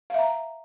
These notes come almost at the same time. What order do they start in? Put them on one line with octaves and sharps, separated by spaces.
F5 E5 A#5